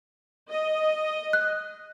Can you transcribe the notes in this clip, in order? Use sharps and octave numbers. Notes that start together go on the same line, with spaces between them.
D#5
F#6